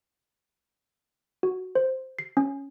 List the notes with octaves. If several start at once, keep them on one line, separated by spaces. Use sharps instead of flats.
F#4
C5
C7
C#4